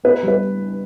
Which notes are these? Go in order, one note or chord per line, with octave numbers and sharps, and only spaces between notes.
B3 B4
G3
B4